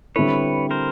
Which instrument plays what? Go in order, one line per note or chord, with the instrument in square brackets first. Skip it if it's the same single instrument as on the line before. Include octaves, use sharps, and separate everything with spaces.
[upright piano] D3 G3 C4 E4 A4 [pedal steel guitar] B4 C#5
[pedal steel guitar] A#4 C5